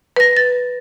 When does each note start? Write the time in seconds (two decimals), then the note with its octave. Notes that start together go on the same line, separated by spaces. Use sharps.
0.16 B4 A#6
0.37 A6